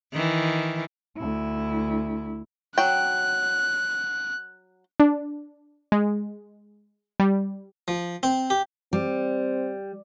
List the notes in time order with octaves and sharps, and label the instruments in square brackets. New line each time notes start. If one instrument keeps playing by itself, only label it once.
[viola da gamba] D#3 E3
[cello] D2 E4
[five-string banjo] F#3 G5 [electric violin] F#6
[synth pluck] D4
G#3
G3
[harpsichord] F3
C4
G4
[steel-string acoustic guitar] G3 [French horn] C4